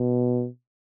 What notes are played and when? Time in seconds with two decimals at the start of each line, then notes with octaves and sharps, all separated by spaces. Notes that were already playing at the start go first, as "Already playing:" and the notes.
Already playing: B2